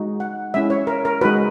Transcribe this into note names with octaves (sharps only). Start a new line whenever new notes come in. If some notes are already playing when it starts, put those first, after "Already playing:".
Already playing: G#3 D#4 F#4
F#5
G#3 C#4 E4 E5
C#5
A#4
A#4
G#3 D#4 F#4 B4